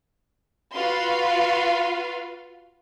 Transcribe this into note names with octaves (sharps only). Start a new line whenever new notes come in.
F4 F#4 B4 F5 C6